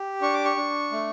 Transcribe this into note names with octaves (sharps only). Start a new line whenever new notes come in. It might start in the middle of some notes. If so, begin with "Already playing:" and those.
Already playing: G4
D4 C#6
D6
C#6
D4
A3